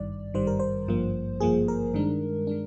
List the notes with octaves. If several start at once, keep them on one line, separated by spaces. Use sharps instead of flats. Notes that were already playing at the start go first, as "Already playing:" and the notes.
Already playing: G#1 G2 D#3 G3 D5
G#1 G2 D#3 G3 C5
A#4
C5
G#1 G2 F3 A#3
G#1 G2 F3 A#3 G#4
A#4
G2 D#3 G#3 D4
D#3 G#3 D4